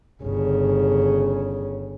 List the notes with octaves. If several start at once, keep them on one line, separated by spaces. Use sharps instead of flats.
G1 C#3